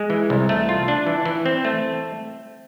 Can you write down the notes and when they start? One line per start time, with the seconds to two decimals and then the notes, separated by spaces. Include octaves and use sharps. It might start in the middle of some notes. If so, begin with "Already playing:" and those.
Already playing: G#3
0.10 E3
0.30 C2
0.49 A3
0.69 F4
0.88 D4
1.07 E3
1.26 E3
1.46 C4
1.65 A3